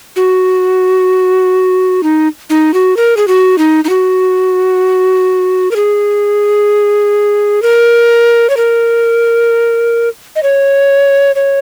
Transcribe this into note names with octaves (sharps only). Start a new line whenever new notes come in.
F#4
D#4
D#4
F#4
A#4
G#4
F#4
D#4
D#4
F#4
A#4
G#4
A#4
C#5
A#4
D#5
C#5
C#5